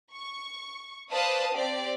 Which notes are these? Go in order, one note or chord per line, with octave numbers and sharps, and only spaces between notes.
C#6
B4 C5 D5 F5 A5 D#6
C4 G4 D5